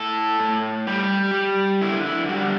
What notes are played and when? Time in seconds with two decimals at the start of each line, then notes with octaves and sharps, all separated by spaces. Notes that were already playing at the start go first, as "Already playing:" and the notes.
Already playing: A2 A4
0.40 A2
0.87 G3 G4
1.34 G3
1.81 D3 E4
2.05 E4
2.29 G3 F#4